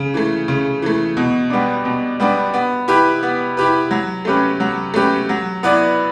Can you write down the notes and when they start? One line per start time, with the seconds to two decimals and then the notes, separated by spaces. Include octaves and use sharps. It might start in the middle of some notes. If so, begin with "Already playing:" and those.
Already playing: C#3
0.14 E3 A3
0.48 C#3
0.82 E3 A3
1.17 B2
1.50 G3 B3 D4
1.85 B2
2.20 G3 B3 D4
2.54 B3
2.88 E4 G4 B4
3.23 B3
3.57 E4 G4 B4
3.91 F#3
4.25 A3 C#4 G4 B4
4.60 F#3
4.94 A3 C#4 G4 B4
5.29 F#3
5.63 B3 E4 B4 D5